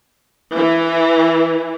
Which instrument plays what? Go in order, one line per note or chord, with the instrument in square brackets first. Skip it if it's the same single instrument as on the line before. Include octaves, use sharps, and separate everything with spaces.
[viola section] E3